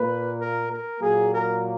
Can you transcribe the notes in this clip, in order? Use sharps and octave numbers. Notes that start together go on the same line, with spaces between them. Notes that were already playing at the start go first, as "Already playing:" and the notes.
Already playing: A#2 A#3 B4
A#4
A#4
A#2 F#3 A#3 G#4
A#4